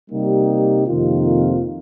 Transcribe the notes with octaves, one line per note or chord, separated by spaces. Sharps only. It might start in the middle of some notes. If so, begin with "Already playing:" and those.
C3 G3 A#3 D#4 G4
F2 C3 D#3 A#3 F4